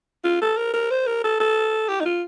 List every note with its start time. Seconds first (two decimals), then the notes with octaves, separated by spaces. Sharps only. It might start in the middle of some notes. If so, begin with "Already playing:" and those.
0.24 F4
0.41 A4
0.57 A#4
0.74 A#4
0.91 C5
1.07 A#4
1.24 A4
1.40 A4
1.88 G4
2.01 D#4
2.06 F4